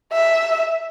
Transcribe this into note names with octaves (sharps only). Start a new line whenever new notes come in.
E5